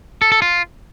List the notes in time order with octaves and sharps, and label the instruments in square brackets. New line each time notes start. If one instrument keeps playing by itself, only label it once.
[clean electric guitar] A4
A4
F4